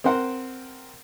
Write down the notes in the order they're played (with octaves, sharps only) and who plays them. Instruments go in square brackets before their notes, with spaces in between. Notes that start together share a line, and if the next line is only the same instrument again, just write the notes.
[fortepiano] C4 A#4 C5 F#5